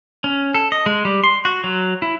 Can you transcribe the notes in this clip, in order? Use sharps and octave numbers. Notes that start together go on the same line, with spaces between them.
C#4
A4
D#5
G#3
G3
C6
F#4
F#3
E4